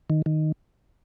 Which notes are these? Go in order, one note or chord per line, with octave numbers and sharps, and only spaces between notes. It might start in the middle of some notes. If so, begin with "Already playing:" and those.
D#3
D#3